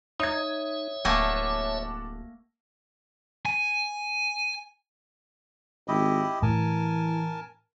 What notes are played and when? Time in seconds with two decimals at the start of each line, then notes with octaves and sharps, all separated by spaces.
0.20 D#4 C#5 E5 D#6 G#6
1.05 D1 A3 A#3 F#5 G#5 A5 D6
3.45 G#5
5.88 G#1 E4 G4 D#5
6.42 A2 E3 A#4 G#5 A5